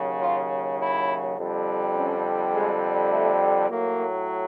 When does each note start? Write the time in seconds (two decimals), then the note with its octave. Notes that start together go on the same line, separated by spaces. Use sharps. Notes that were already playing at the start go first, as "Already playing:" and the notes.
Already playing: D#2 C#3 F#3
0.19 F4
0.79 E4
1.36 F2 D3 G3
1.95 C#4
2.53 G#3
3.12 A3
3.69 A2 F#3 A#3